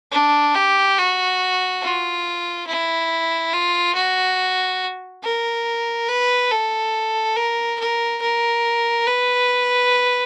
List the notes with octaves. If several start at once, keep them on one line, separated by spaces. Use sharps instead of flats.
D4
G4
F#4
F4
E4
F4
F#4
A#4
B4
A4
A#4
A#4
A#4
B4